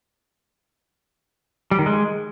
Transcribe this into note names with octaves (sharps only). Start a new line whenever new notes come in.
G3
D#3
G#3